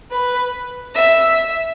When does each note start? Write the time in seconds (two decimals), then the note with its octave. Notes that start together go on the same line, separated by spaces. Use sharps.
0.11 B4
0.95 E5